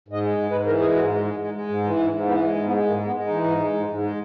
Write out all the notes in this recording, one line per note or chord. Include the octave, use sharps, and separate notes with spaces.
G#2 D#5
G#3
G#2
G#2 B4
E3 A#4
G#3 G#4
G#2 F#4
G#3
G#3
G#3
G#3
G#2
E3
G#2
G#2
E3 B3
G#3
G#2
B3
G#3
G#2 A#3
G#3 B3
G#3
E3 D#4
G#2
G#3
G#2
G#2
G#3